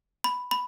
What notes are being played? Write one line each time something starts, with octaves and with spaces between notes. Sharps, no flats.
B5
B5